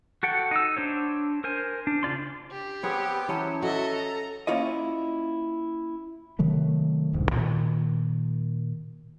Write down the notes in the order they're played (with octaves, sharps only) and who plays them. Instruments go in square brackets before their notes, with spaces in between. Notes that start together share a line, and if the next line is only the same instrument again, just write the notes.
[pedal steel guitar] F#4 A4 F#5 G5
D#4 E6
D4 C5 C#5
A#4 C5 G#5
D4
C#3 F4 D5 C6
[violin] G4
[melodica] B3 C4 B4 [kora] G#4 C#5
[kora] E3 C#4 C#5 [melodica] F#3 [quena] A5
[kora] F#4 [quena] A4 [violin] D#5 E5
[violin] A#5
[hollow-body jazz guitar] A#3 C#4 E4 F4 C#5 D#5
[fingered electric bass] C3 D#3 F#3 A3
E1 C2 G#2 G#3
A#2 D#3